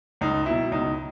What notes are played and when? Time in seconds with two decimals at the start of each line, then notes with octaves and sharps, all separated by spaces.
0.21 C#2 D#4
0.46 B2 F#3 E4
0.71 C#2 D#4